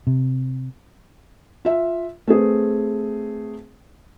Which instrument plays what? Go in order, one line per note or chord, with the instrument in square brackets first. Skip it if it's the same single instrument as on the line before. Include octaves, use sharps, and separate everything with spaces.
[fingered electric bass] C3
[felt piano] F4 E5
A3 C4 G#4 B4